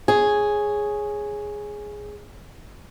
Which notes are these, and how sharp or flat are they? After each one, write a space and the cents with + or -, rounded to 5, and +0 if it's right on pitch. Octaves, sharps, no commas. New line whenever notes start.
G#4 +0 C#5 +0